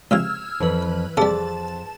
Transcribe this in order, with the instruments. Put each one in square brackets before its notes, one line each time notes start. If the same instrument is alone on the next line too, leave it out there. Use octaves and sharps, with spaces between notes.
[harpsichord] C#2 C3 F3 [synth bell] E6 F6 G#6
[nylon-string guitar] F2 [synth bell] E3 B4
[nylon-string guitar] F2 [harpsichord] C3 G3 [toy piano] G#4 E6 [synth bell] A5